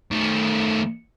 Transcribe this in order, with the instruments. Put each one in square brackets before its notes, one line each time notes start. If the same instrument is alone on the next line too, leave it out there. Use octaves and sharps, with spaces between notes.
[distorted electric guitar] D#3 A3